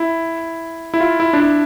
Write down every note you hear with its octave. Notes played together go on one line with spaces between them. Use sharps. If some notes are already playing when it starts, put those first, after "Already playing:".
Already playing: E4
E4
F4
E4
D4
E4